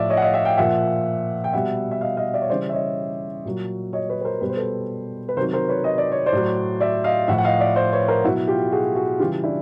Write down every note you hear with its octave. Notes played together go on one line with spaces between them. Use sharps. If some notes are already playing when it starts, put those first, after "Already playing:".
Already playing: A2 F3 D5 E5
C#5 D#5
F#5
D#5 F5
E5 F#5
F5 G5
A#2 F3 E5 F#5
G5
B2 G3 E5 F#5
E5
D#5 F5
D#5 F5
D5 E5
C#5
C#3 E3 G3 C5 D5
E5
C#5 D#5
A#2 F#3
C#5 D#5
B4 C#5
B4
A#4 C5
B2 G3 B4
C5
A4 B4
B4
C3 D#3 F#3 A#4 C5
A#4 C5
B4 C#5
D#5
D5
C#5
C5 D5
A2 F#3
D5 E5
D#5 F5
A2 F3 E5 F#5
F#5
D#5 F5
D5 E5
C5 D5
B4 C#5
A#4 C5
B2 F#3 E4 F#4
F4 G4
F#4 G#4
F#4 G#4
C#3 E3 G3 F4 G4
D4 E4